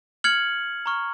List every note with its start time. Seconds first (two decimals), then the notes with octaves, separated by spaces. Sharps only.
0.24 F6 G#6 C#7 F#7
0.86 A#5 C#6 F6